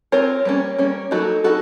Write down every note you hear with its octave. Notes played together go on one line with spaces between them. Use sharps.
C4 F4 A#4 C#5
G3 A#3 C#4
G3 A#3 C#4
F#3 A#3 D#4 F#4 A4
D#4 F#4 A4